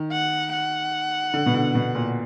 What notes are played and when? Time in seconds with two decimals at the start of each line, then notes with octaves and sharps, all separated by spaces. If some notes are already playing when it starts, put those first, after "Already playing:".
Already playing: D#3
0.12 F#5
0.53 F#5
1.34 D3
1.46 B2
1.54 D3
1.75 B2
1.95 A#2